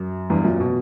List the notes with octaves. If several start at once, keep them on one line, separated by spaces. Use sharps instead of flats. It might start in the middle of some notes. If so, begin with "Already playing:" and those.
Already playing: F#2
E2 G2
F#2 A#2
B2